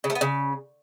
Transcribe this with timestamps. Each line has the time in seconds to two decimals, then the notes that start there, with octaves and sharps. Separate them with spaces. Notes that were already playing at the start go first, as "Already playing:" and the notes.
0.04 C#3
0.10 A3
0.15 B3
0.21 C#3